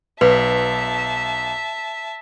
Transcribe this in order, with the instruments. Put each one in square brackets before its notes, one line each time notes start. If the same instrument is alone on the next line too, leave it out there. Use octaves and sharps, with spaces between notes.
[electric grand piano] B1 [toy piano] B4 [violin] E5 A5